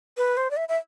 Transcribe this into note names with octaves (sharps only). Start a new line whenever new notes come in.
B4
C5
D5
E5
E5